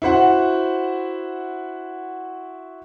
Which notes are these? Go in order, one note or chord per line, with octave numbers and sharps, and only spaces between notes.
E4 F#4 C5 F#5